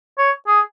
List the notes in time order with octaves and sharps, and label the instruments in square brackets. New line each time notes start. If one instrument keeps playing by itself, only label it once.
[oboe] C#5
G#4